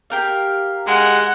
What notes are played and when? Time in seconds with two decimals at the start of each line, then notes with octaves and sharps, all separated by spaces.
0.10 G4 A#4 F5
0.87 G#3 F#5